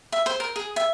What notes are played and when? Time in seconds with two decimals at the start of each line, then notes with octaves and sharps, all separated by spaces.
0.12 E5
0.26 C5
0.40 A#4
0.56 G#4
0.76 E5